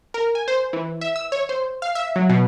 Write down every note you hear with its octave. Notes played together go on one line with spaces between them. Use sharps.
A#4
G#5
C5
E3
E5
E6
C#5
C5
F5
E5
F#3
B2